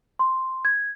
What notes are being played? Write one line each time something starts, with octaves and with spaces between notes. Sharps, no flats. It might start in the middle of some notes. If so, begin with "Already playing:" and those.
C6
G#6